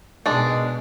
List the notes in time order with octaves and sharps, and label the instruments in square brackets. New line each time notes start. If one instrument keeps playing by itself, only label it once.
[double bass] B2 [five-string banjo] D#3 G#3 D4